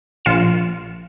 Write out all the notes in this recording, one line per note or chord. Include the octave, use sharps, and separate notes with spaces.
A#1 F4 C#7 E7